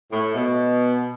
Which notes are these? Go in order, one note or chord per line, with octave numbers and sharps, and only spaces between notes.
A2
B2